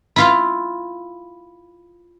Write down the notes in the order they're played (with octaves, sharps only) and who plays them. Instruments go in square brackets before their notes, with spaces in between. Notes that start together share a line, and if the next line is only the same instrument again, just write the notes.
[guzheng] E4 F4 F5